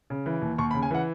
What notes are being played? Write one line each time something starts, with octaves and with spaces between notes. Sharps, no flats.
C#3
E3
D#2
D#2 C#6
B5
C#3
G#5
E3 F#5